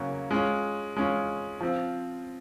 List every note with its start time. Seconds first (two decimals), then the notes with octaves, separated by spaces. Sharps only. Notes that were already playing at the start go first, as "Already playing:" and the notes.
Already playing: C#3 F#3 A#3 C#4 F#4
0.31 G#3 C#4 F4
0.96 G#3 C#4 F4
1.61 F3 C4 F4